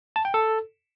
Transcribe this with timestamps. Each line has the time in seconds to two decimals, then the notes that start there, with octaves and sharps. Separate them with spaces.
0.16 A5
0.25 G5
0.34 A4